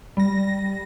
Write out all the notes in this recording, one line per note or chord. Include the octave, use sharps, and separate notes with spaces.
G3 A#6